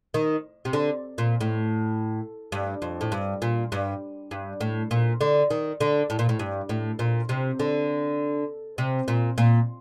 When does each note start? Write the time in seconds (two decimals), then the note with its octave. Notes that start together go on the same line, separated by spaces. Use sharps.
0.14 D#3
0.65 C3
0.73 D3
1.18 A#2
1.41 A2
2.52 G2
2.82 F2
3.01 A2
3.12 G2
3.42 A#2
3.72 G2
4.31 G2
4.61 A2
4.91 A#2
5.21 D3
5.50 D#3
5.81 D3
6.10 A2
6.19 A#2
6.29 A2
6.39 G2
6.69 A2
6.99 A#2
7.29 C3
7.60 D3
8.78 C3
9.08 A#2
9.38 A#2